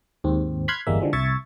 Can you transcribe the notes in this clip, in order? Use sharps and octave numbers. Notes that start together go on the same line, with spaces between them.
D#2 G#2 C4
B5 C6 F6 F#6 G#6
G1 E2 G3 G#3 A#3 E5
D3 E3 F3 G3 G#3
C2 E5 C#6 G#6 A6